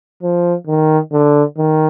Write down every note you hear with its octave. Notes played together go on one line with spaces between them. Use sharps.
F3
D#3
D3
D#3